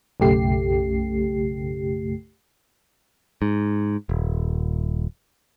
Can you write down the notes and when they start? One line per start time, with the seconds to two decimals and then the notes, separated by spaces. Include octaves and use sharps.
0.20 B1 F#2 C#3 A3 G4 C7
3.42 G#2
4.09 D#1